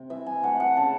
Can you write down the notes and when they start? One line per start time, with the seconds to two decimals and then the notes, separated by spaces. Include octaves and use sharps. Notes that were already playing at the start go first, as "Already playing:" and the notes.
Already playing: C3
0.10 E3 E5
0.26 G#5
0.43 A3 F#5
0.60 F#5
0.77 C#3 A5